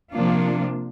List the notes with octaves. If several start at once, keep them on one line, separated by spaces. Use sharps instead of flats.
C3 F3 A#3 D4 F4